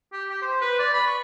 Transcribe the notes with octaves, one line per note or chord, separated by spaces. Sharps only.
G4
G4
C5
B4
D5
B5
C#6